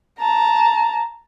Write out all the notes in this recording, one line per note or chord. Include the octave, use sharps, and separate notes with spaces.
A5 A#5